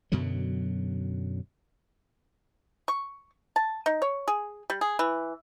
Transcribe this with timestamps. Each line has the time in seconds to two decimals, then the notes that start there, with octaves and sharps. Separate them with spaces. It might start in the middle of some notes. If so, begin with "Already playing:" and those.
0.12 F#2 B2 D3 F#3
2.88 C#6
3.56 A5
3.86 D#4
4.02 C#5
4.28 G#4
4.70 G3
4.81 G#4
4.99 E3